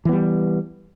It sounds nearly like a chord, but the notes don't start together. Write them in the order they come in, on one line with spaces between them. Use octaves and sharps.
E3 B3 G3